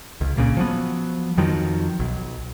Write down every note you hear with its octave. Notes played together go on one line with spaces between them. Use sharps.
C#2
A#1 A#2 C#3
F3 F#3 B3
F2 D#3 F3 F#3
B1